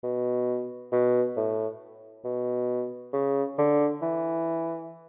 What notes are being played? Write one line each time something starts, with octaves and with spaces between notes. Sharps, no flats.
B2
B2
A2
B2
C#3
D3
E3